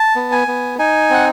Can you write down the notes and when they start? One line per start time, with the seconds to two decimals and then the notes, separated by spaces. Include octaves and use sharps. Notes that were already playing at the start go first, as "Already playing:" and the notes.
Already playing: A5
0.16 B3
0.32 G#5
0.48 B3
0.79 D#4 G#5
1.10 C4 F#5